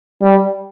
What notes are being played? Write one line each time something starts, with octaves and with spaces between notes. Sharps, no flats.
G3